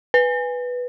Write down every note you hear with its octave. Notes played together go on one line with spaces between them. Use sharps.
B4